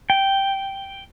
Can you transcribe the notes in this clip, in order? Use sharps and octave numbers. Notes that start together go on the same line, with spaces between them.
G5